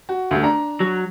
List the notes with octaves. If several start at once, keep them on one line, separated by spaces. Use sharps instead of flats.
F#4
D2 A3
D4 A#5
F#3